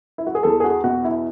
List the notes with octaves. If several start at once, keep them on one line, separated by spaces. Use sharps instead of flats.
E4
F#4
G#4
E2 A4
G#4
F#4
B2 F#4
E4